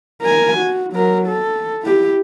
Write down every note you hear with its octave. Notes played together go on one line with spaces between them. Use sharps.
A#4 G#5
F#4
F#3 A#4
A4
E4 G4